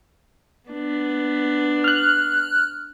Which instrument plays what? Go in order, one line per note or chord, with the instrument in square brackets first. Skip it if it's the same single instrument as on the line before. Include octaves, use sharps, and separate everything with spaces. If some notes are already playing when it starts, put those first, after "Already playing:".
[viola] B3 D4
[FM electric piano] F6 F#6